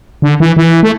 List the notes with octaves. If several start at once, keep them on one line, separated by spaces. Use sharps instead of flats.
D3
E3
E3
A3